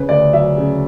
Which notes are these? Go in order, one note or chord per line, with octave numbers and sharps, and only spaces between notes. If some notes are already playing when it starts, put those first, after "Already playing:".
Already playing: C#3 B4
D2 D5
F#3 E5
C#3